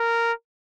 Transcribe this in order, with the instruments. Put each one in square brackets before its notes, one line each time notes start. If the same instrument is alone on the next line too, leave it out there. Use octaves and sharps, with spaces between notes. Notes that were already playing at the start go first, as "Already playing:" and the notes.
Already playing: [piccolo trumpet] A#4